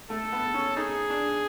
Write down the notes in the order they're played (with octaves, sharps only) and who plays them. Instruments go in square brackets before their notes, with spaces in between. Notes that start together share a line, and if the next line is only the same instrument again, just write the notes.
[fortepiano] A3 [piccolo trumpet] A4
[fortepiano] B3
C#4
[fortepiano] D#4 [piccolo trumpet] G#4
[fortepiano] D4